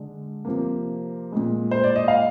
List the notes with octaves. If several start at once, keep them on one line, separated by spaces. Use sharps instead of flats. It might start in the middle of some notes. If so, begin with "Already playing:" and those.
Already playing: D3 G#3
C3 F3 A#3
A#2 G#3
C5
D5
D#5
F5